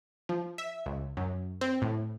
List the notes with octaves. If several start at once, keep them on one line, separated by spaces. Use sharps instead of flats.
F3
E5
C#2
F#2
C4
A2